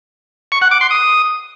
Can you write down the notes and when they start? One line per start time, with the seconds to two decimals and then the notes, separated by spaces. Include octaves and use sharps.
0.52 C#6
0.62 F#5
0.71 D6
0.81 C6
0.91 D#6